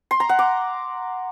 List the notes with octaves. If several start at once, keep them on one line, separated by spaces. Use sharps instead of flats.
C6
A#5
F#5
D6